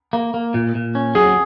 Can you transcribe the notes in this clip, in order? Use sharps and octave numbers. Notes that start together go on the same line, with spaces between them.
A#3
A#3
A#2
A#2
C#4
F#3 G#4